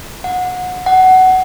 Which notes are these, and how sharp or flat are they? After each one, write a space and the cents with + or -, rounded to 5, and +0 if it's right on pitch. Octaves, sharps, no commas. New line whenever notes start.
F#5 -25
F#5 +15